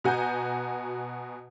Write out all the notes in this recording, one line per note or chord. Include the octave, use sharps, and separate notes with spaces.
B2 F#4 G#5 A#5 G6